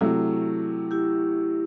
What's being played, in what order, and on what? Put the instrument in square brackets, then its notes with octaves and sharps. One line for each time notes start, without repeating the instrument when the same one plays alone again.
[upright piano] C3 F#3 A3 [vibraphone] E4
[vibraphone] E4 G4